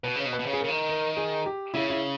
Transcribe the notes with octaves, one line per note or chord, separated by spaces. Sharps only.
B2 B4
C#3
B2
B4
B2
C#3
G#4
C#3 A#4
D#3
A#4
G#4
G4
C#3 E4
E4